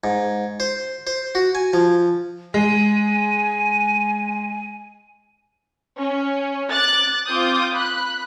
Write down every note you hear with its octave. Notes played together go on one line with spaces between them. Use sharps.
G#2
C5
C5
F#4
G#5
F3
G#3 G#5
C#4
D6 F#6 A6
C4 F4 D6 D#6 G6
B5 F#6